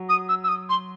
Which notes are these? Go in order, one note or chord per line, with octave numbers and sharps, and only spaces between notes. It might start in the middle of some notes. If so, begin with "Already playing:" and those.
Already playing: F#3
D#6
E6
E6
D#6
C6